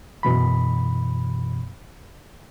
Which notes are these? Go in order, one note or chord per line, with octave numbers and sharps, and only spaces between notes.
F#2 B2 E3 B5